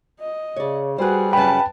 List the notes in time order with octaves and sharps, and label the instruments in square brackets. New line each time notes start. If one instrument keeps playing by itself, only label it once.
[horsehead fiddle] D#5
[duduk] C#3 [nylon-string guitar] C#5 D5
[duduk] G3 [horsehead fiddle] F#4 G#4 [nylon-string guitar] B4 C5
[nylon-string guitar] F#2 C#3 [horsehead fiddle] B4 A5 [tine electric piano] G5 B5